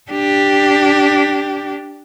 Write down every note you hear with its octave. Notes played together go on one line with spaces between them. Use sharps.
D4 G4